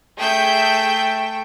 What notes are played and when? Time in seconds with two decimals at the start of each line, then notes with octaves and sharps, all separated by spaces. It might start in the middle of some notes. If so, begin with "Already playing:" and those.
0.18 A3 G#4 E5 G5 G6